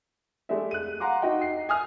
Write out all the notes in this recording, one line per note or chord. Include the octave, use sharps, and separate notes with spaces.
G#3 A3 G4 D5 E5
F#6 D#7
F5 F#5 A#5 C6 D6
D#4 F#4 D#5 G5
C7
G#5 D#6 F6